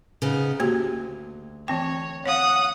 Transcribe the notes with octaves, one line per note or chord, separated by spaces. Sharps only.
C#3 B3 D#4
D2 A#3 F#4 G4
E3 C4 C#5 G5
C#5 F5 F#5 D#6